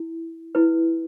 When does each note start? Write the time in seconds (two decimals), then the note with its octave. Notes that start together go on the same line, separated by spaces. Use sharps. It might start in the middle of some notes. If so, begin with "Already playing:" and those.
Already playing: E4
0.55 E4 B4